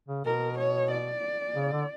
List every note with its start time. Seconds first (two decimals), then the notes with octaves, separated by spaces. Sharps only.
0.08 C#3
0.25 B2 A#4
0.58 C#5
0.91 D5
1.55 C#3
1.72 D3